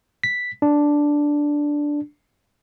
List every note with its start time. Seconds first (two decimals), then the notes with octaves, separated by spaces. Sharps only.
0.24 B6
0.62 D4